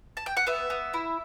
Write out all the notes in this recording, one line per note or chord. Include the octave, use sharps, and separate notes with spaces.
A5
G5
F#5
B3 E5
B3
E4